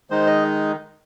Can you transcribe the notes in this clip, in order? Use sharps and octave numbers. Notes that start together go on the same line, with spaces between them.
D#3 G#3 D#4 C5
D#5